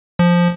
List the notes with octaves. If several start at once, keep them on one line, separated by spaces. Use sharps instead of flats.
F3